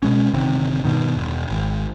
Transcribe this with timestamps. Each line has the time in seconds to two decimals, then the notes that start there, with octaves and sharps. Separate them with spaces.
0.03 B2 G#3 C#4
0.34 G1 C3 D#3
0.84 G2 B2 D#3
1.15 E1
1.49 G#1